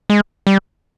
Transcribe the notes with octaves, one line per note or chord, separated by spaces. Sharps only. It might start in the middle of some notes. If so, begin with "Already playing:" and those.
G#3
G3